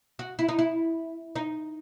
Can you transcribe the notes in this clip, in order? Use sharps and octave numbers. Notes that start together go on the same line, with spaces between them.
F#4
E4
D#4
E4
D#4